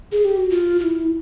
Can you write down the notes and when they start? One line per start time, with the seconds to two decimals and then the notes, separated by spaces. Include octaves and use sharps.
0.12 G#4
0.25 G4
0.37 F#4
0.50 F4
0.80 F4
0.84 E4